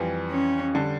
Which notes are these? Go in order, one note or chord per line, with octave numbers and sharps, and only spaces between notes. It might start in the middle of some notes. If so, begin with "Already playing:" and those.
Already playing: F2 E3 G3
C#4
D3 G3